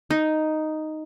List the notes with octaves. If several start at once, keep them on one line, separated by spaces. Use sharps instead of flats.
D#4